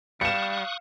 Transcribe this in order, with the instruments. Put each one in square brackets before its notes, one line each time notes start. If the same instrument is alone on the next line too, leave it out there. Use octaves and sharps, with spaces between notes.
[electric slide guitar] G3 [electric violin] F5 [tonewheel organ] C#6 D#6 F#6 [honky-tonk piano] C#7 E7